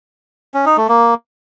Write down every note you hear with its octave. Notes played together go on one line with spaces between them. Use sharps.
C#4
D#4
A3
A#3